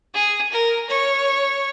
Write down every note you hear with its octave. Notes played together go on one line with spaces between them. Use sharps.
G#4
A#4
C#5